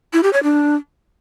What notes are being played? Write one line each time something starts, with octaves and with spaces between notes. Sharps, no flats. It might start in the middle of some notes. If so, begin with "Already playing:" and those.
E4
G4
C#5
D4